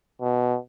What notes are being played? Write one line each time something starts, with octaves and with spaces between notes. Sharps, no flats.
B2